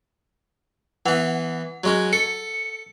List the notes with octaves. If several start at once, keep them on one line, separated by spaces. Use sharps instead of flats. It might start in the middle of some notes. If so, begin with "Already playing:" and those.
E3 B3 F#5
F#3 G#3 C#4
A4 C#7